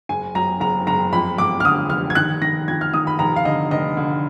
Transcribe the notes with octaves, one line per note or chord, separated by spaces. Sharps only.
F#1 G#5
F#2 A#5
F#1 A#5
F#1 A#5
F2 B5
F2 D6
F6
D3 D#6
F1 F6
G#6
D#3 F#6
D#3 A#6
F2 G#6
F6
D#3 D#6
B5
F1 A#5
F5
D3 D#5
F1 D#5
D3